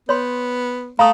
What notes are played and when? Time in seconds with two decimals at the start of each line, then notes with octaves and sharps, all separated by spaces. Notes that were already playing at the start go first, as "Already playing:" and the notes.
0.09 B3 C#5 C6
0.99 A3 F5 A#5 D#6